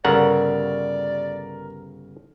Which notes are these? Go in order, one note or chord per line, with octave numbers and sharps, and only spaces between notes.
G1 C#3 A#4 D5 F#5